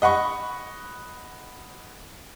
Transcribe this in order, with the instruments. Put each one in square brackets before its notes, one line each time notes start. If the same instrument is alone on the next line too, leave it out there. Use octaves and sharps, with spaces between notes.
[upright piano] D#5 F#5 B5 C#6